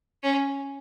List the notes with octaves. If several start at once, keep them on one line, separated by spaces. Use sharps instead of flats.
C#4